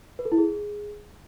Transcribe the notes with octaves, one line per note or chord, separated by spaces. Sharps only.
B4
A4
E4
G#4